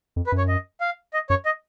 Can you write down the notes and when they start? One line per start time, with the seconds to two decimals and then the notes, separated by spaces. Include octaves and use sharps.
0.16 F2
0.26 B4
0.32 F#2
0.38 C#5
0.48 D#5
0.80 F5
1.13 D#5
1.30 F#2 C#5
1.45 D#5